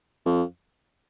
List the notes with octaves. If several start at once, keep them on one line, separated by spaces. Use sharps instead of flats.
F2